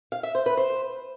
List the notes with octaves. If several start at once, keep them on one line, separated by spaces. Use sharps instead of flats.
F5
E5
C5
B4
C5